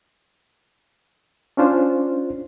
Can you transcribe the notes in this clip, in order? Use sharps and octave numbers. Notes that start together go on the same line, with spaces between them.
C#4 D4 F4 C5